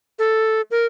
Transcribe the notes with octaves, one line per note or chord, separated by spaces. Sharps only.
A4
A#4